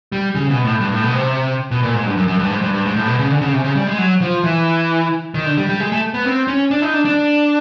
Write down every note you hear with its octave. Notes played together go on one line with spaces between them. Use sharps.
G3
C#3
B2
A2
G2
A2
B2
C3
B2
A#2
G#2
G2
F#2
F#2
G2
G#2
G2
G2
G#2
A2
B2
C#3
D3
C#3
C3
C#3
G3
G#3
F#3
F3
E3
D#3
D3
G3
G3
G#3
A3
B3
C4
C#4
D4
D#4
D4
D4